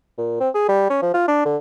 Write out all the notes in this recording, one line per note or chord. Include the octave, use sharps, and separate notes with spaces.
A#2
C4
G#4
G3
C#4
F3
F4
D4
D3